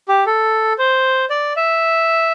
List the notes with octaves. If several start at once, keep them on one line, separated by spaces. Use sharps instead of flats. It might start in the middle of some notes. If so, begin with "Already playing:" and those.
G4
A4
C5
D5
E5